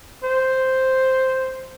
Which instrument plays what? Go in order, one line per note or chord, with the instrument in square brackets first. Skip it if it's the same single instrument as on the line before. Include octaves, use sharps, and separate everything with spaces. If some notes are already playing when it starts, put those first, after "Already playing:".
[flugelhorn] C5